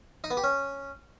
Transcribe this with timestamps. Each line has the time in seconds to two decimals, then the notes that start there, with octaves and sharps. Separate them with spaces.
0.24 D#4
0.31 B3
0.37 G4
0.44 C#4